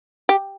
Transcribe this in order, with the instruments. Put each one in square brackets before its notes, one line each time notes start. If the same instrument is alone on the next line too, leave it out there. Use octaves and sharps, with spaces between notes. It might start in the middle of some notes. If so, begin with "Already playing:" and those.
[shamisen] G4